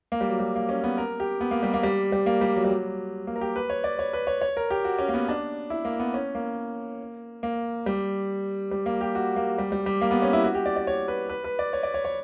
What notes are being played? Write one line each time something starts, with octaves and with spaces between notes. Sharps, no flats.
A#3
G3
F#3
G3
A#3
C#4
B3
A#4
G4
B3
A#3
G3
A#3
G3
G3
A#3
G3
F#3
G3
F#3
A#3
A#4
G4
B4
C#5
D5
C#5
B4
C#5
C#5
A#4
G4
F#4
C#4
A#3
B3
D4
E4
A#3
B3
C#4
A#3
A#3
G3
G3
A#3
G4
F#4
A#3
G3
G3
G3
A#3
B3
C#4
E4
F#4
G4
D5
D5
C#5
B4
B4
B4
D5
C#5
D5
C#5
C#5